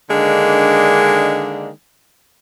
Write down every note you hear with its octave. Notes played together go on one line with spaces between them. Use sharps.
D3 D#3 G#3 A#3 D4